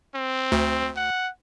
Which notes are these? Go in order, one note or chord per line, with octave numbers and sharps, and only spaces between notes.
C4
D2
F#5